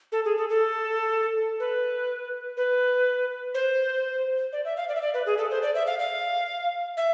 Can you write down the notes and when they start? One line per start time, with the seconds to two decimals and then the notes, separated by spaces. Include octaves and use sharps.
0.12 A4
0.25 G#4
0.37 A4
0.49 A4
1.60 B4
2.57 B4
3.54 C5
4.53 D5
4.65 E5
4.77 F5
4.89 D5
4.95 E5
5.01 D5
5.14 B4
5.26 G#4
5.38 A4
5.50 C5
5.62 D5
5.75 E5
5.86 F5
5.99 F5
6.97 E5